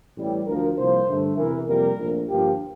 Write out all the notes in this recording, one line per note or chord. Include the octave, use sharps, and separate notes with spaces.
A1 A2 G3
D2 D3 F3 A#4
C2 C3 F3 A#3 C5
G2 D3 A3
E2 C3 E3 A#4
F2 C3 G3 A#3 A#4
A#1 A#2 A3
G1 G2 F3 A#3 G4